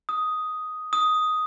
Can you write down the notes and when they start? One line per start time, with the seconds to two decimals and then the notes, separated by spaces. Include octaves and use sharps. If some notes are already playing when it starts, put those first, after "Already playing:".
0.09 D#6
0.93 D#6